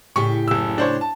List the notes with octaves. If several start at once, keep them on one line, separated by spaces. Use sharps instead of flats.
A2 C#3 G4 C#6
F#1 E6
D4 C5 C#5
A5